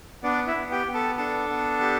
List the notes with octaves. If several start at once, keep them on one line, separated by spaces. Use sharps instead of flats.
B3 D4 D5
E4 E5
B3
G4 G5
B3
A4 A5
D4 A4 A5
B3
G4